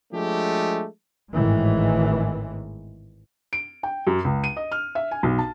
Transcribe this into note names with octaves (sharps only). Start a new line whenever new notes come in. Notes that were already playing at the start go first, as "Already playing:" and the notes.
F3 G#3 A3 D4 G4
G#1 A2 D#3 E3 G#3
D7
G5
F#2
C#2
D#7
D#5
F6
E5
G#5
B1
A5